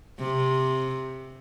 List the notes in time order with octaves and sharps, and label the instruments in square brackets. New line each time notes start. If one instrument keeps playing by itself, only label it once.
[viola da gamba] C3